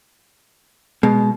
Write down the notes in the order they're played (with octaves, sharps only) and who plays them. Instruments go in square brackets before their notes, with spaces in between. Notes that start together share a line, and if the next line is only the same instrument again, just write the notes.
[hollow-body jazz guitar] B2 [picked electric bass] G#3